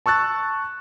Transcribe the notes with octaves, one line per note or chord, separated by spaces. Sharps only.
A5 C#6 E6 F#6 A6